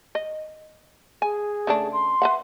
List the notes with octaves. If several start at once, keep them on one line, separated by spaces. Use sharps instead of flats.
D#5
G#4 G#5
C#3 A3 D4
C6
B4 E5 F#5